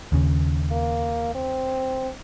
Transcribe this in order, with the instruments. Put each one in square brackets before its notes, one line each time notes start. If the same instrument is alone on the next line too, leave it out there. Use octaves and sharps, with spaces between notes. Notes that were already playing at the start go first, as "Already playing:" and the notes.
[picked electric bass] D#2 C#3
[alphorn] A#3
C4